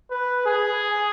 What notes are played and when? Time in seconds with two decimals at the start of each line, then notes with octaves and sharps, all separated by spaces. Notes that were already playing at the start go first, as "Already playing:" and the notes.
0.10 B4
0.46 G#4